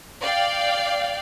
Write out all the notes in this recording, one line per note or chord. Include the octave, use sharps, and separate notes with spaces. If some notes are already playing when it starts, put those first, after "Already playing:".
D5 F5 G5